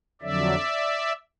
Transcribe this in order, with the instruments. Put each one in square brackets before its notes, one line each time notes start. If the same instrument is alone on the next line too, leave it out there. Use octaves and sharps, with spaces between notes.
[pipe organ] F2 D3 F#3 D5 E5